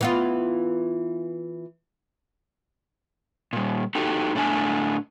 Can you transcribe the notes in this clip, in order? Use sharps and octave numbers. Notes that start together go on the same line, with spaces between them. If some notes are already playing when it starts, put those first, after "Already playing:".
E3 B3 F4
A#2 G3
D#4 F#4 G4 A4
A2 A3 D4 G#5